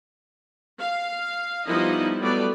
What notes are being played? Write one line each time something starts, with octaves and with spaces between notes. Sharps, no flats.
F5
F3 G3 B3 D#4 E4 D#5
F#3 G3 A3 B3 B4 D5